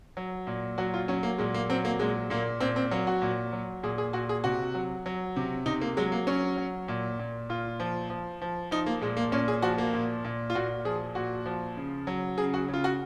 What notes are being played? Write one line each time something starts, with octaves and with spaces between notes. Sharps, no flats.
F#3
A#2
F#3 F#4
F4
F#3 C#4
A#3
A#2 G#3
A#3
F#3 C4
A#3
A#2 G#3
A#2 A#3
A#2 C4
C4
F#3 A#3
F#4
A#2
F#3
A#2 G#4
G#4
A#2 F#4
G#4
C3 F#4
F#3
F#3
C3
C3 D#4
A#3
F#3 G#3
A#3
F#3 C#4
F#3
A#2
A#2
A#2 F4
F3
F3
F3
F3 D#4
A#3
A#2 G#3
A#3
A#2 C#4
G#4
F3 F#4
A#3
A#2
A#2
F4
A#2 F#4
F3 G#4
A#2 F#4
F3
C#3
F#3
C#3 G#4
F#4
C#3
F4
F#4